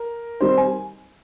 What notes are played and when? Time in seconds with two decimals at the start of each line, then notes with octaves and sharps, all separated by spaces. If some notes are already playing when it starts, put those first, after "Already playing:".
Already playing: A#4
0.41 D#3 G3 C4 D#4 C5
0.57 G#5